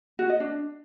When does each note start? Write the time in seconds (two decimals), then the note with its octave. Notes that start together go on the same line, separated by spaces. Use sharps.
0.19 F#4
0.30 D#5
0.40 D4